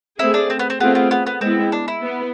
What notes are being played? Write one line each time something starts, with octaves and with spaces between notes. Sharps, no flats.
A3 C4 E4 G#4
D4
C4
B3
C4
A3 B3 C4 F4 G#4
B3
B3
B3
G#3 B3 C4 E4
D4
E4
B3